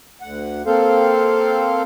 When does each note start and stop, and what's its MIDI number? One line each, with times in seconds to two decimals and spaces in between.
0.21 0.62 38
0.21 0.62 78
0.66 1.82 58
0.66 1.82 60
0.66 1.82 69
0.66 1.82 72
0.66 1.82 77